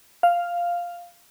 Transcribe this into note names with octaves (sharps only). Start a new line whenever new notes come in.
F5